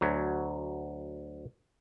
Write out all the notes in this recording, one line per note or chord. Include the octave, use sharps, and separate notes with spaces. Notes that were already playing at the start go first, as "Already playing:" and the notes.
D2 F#3